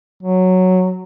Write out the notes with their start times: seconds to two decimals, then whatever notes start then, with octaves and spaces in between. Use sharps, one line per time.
0.23 F#3